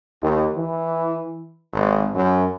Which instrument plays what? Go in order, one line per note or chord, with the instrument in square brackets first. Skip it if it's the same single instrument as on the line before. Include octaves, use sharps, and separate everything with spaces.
[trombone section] D#2
E3
G#1
F#2